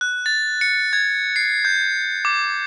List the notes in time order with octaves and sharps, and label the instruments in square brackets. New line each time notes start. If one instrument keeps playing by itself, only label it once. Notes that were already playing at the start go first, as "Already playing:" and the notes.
[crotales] F#6
A6
C#7
G#6
C7
G6
D6